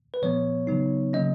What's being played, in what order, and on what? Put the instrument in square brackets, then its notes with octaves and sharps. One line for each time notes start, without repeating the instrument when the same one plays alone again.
[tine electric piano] B4
A#2 F3 B3 C#5
C#3 F#3 B3 D#4
C#3 F#3 A#3 C#4 D#5